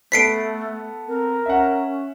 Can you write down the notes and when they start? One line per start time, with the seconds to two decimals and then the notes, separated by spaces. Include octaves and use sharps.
0.12 A3 B3 A4 B4 B6 C7 D7
1.08 C4 A#4
1.46 C#4 E5 F#5